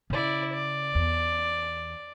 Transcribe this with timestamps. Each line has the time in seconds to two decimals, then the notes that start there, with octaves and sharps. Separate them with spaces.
0.10 C#3 E4 D5
0.52 D5
0.95 E2